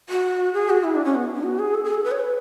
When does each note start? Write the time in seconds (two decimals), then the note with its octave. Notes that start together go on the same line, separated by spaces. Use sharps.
0.09 F#4
0.54 G#4
0.70 F#4
0.84 E4
0.95 D4
1.05 C#4
1.15 B3
1.34 D4
1.44 F#4
1.59 G#4
1.74 A4
1.84 G#4
1.94 A4
2.04 B4
2.12 C#5
2.19 B4